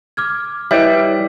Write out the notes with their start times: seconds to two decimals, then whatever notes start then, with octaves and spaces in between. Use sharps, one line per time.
0.17 D6 F6 G#6
0.71 G3 E4 B4 C#5 D#5 E5